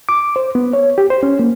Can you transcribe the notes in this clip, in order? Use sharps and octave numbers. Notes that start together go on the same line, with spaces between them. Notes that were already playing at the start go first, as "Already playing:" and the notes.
D6
C5
B3
C#5
G4
C5
C#4
A#3